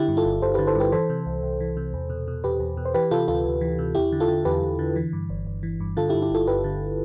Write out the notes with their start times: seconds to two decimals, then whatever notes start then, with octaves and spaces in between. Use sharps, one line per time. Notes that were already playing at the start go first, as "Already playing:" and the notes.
Already playing: D3 E4 G4
0.08 G2
0.17 F4 A4
0.25 G1
0.42 G1 A4 C5
0.54 D3 G4 B4
0.67 A4 C5
0.75 G2 G4 B4
0.92 E3 A4 C5
1.10 C3
1.26 C2
1.43 C2
1.60 E3
1.77 C3
1.94 E2
2.10 B2
2.28 B2
2.44 E2 G4 B4
2.60 E2
2.77 B2
2.85 C5
2.94 E3 G4 B4
3.11 C3 F4 A4
3.28 D2 F4 A4
3.45 D2
3.61 E3
3.79 C3
3.95 E2 E4 G4
4.12 D3
4.20 F4 A4
4.28 D3
4.45 E2 G4 B4
4.62 E2
4.79 D3
4.96 E3
5.13 G2
5.30 G1
5.47 G1
5.63 E3
5.80 G2
5.97 D3 F4 A4
6.09 E4 G4
6.14 G2
6.22 E4 G4
6.30 G1 F4 A4
6.47 G1 G4 B4
6.64 D3